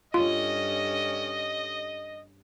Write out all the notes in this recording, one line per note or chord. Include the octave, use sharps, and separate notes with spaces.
G2 C#4 F4 A4 D#5